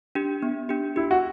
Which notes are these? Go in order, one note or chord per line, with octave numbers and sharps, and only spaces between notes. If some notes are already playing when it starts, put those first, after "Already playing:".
D4 G4
B3
D4 G4
E4 G4
F#4